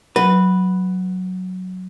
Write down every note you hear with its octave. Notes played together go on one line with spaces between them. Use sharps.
F#3 B4